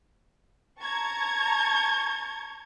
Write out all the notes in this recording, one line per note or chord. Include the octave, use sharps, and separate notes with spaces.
A5 A#5 C#6 G#6